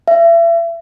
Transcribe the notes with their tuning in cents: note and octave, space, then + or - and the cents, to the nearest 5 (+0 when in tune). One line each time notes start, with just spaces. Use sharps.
E5 +35